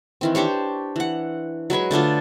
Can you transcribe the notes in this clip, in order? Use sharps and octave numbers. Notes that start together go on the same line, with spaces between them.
D#3 E3 C4
D4 G4 C5 C#5
E3 F#5
F#3 G#3 B4 G#5
D3 A3 D4 F4